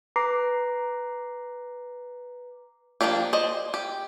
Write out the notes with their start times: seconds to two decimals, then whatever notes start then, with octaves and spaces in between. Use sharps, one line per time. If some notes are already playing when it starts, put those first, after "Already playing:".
0.16 B4 A#5 D6 A#6 C7
3.01 F3 F#3 A#3 D4 G4
3.33 C5 D5 D#5
3.74 G4